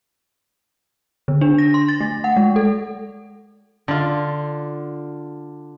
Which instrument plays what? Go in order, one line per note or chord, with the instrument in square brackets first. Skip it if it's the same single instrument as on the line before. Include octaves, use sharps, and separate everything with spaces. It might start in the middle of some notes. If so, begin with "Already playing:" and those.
[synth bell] D3
D4
A#6
C6
A6
A3
F#5
G#3
A4
[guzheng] D3 F4